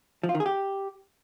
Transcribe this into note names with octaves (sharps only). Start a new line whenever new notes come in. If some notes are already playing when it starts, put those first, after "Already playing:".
F3
F4
D#3
G#4
G4